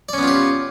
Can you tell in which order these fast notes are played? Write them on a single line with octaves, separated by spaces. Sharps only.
D5 C#4 B3 F4 G4